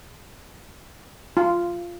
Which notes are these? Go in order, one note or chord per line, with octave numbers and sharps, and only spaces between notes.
F4